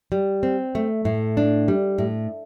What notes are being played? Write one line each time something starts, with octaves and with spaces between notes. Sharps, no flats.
G3
C4
A3
A2
D4
G3
A2